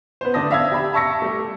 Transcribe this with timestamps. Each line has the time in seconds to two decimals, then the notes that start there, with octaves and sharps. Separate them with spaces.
0.21 B3 C5
0.34 D3 A3 D5 A5 D#6 A#6
0.50 E5 F5 E6 G#6
0.71 G4 B5
0.93 E5 A5 C#6 E6 A#6 C#7
1.22 G3 A3